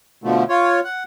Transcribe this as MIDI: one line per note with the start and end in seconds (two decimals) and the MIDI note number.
0.24 0.44 47
0.24 0.44 50
0.24 0.44 53
0.24 0.44 57
0.49 0.80 65
0.49 0.80 73
0.84 1.04 78